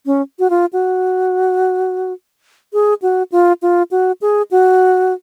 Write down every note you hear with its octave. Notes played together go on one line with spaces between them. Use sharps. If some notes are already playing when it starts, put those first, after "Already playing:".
C#4
F#4
F4
F#4
G#4
F#4
F4
F4
F#4
G#4
F#4